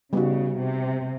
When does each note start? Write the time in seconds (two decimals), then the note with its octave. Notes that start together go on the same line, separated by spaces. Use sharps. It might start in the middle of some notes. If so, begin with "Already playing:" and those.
0.13 C#3 G3 B3 D#4 F#4
0.58 C3